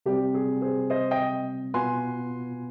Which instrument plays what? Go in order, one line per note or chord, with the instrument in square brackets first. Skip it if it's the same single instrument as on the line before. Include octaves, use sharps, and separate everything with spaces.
[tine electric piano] C3 G3 C4 [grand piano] G4
[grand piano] G#4
G#4 C5
C5 D#5
D#5 G5
[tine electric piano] B2 B3 F4 B4 [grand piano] G#5 C6